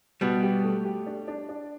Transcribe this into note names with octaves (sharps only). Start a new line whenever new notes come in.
B2 G3 B3
G4
A3
G4
D4
D4
D4